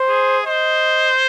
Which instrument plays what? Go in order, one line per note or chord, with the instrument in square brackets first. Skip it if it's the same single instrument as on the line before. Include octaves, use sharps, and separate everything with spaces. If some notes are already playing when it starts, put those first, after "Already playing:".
Already playing: [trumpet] C5
[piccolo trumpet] G#4
[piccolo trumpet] C5 [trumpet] D#5